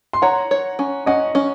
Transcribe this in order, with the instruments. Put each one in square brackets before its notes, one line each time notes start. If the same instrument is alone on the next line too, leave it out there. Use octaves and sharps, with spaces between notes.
[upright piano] C6
[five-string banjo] C#5 [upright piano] F#5 A#5
[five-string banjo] C#5
C#4
[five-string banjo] C#4 [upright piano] D#5 F#5
[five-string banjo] C#4